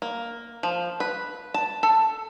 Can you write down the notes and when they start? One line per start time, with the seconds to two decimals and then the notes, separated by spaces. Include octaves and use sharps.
0.02 A#3
0.63 F3
1.00 B4
1.54 A5
1.83 A4